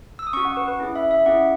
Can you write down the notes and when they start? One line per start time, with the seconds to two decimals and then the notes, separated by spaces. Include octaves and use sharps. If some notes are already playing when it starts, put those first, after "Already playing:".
0.19 E6
0.27 D#6
0.33 C#4 F#4 C#6
0.45 F#5
0.57 B4
0.68 B4
0.80 C#4 E4 G#4
0.96 E5
1.11 E5
1.26 C#4 E4 G#4 F#5